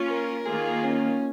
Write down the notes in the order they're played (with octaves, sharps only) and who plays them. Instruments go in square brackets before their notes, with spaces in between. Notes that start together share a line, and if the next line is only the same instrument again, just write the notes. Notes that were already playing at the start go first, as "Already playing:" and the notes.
Already playing: [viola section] A#3 C#4 F4
[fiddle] A#4
[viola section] D#3 A#3 F4 [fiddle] G#4
[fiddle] C#4